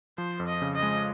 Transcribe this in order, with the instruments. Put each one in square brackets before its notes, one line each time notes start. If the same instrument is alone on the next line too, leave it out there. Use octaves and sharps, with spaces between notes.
[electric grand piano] F3 [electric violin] C5
[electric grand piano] F2
[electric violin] D#5
[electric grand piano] C#3
[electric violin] D#5
[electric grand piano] G#3